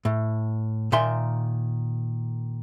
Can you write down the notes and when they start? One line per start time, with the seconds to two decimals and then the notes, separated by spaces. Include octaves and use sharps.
0.05 A2
0.92 A#2 D#3 E5 G#5 C6